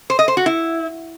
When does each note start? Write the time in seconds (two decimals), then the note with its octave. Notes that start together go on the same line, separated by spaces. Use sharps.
0.10 C5
0.19 D#5
0.28 C5
0.37 F#4
0.46 E4